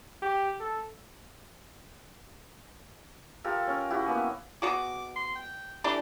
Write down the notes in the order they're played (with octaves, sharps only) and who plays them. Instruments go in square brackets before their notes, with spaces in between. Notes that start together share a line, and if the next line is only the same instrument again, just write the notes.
[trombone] G4
A4
[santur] F4 G4 A4 A#4
C#4 A#4
E4 F#4 G4
A#3 B3 G#5
[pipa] B2 F#4 G#4 [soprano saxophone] D6
[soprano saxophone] C6
G5
[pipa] E3 D4 A4 [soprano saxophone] G4